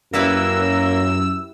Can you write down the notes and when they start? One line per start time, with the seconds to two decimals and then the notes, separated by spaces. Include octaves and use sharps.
0.14 F#2 G3 A#3 E4 B4 E6